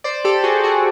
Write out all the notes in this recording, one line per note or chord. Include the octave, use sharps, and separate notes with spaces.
C5 D5
G4 A4
F#4 G#4
F#4 G#4